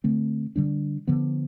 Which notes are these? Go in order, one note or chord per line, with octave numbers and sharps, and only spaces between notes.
D3 A3 C4
D3 G3 D4
D3 F3 B3